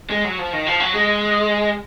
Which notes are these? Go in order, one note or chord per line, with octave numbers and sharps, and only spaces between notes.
G#3
F#3
F3
D#3
F3
F#3
G#3